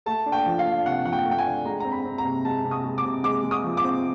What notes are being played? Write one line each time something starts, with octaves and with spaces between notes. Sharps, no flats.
A3 A5
D4
G5
F3
F5
D4
C3 F#5
F3 F#5
G5
A3
G5
G#5
D4
G#3 A#5
C4 A#5
B5
C4
A#5
C3
G#3 A5
C3
D#6
G#3
D6
C3
G#3 D6
G#3
D#6
F3
D6
C4